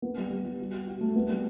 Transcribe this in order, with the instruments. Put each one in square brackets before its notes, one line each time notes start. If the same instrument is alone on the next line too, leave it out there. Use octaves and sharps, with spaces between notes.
[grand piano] B3
G3
G3
G3
F#4
F#4
F#4
A3
B3
G3